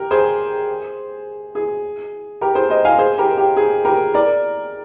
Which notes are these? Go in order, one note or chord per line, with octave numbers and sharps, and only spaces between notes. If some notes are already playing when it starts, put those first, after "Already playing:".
Already playing: G4 A#4
G#4 C5
G#4
G4 A#4
G#4 C5
C5 D#5
F5 G#5
G#4 C5
G4 A#4
G4
G#4
G4 A#4
A#4 D5